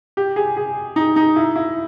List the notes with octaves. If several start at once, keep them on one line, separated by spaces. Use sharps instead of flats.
G4
G#4
G#4
D#4
D#4
E4
E4